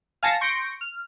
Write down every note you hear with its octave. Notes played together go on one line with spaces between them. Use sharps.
F5 G#5 A5 A#6 C#7
C6 C#6 G6 A#6 C#7 D7
F6